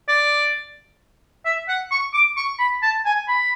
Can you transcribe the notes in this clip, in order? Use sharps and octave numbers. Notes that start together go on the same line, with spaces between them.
D5
E5
F#5
C#6
D6
C#6
B5
A5
G#5
B5